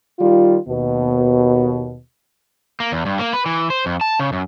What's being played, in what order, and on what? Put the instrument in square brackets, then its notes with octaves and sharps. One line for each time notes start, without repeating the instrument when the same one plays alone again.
[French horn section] D#3 G3 F4
D#2 B2
[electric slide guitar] A#3
E2
G2
A#3
B4
E3
C5
F2
A5
C#3
F#2